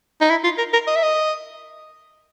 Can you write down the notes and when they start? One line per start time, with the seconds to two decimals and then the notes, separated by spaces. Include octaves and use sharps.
0.21 D#4
0.30 E4
0.44 F4
0.58 A#4
0.73 A#4
0.87 D#5
0.96 E5
1.03 D#5